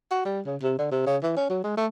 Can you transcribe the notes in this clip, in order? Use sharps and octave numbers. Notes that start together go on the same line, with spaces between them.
F#4
G3
C#3
C3
D3
C3
C#3
E3
C#4
F#3
G#3
A3